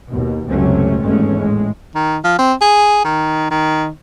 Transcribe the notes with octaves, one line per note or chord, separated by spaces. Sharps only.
D#2 B2
F#1 C#2 C3 F#3 A3 C#4
G#1 E2 G2 G#3 A3 C#4
A2 G#3
D#3
F3
C4
G#4
D#3
D#3